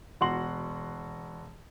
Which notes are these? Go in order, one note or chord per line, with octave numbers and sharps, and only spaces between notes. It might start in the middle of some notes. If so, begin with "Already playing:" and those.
E1 F#4 F#5 C6 F#7